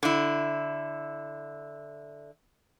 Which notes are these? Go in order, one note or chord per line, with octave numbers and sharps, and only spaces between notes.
D3 E4